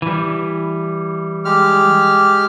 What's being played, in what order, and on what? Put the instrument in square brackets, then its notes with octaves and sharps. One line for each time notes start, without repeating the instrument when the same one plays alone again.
[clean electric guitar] E3 G3
[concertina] G#3 G4 F6